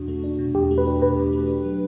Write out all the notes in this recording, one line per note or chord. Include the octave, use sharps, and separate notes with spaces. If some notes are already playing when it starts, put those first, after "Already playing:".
Already playing: E2 B2 D4 F#4
A3
D4
B2
E2 G4
A3
B4
D4
B2 B4
E2
A3
D4
F#3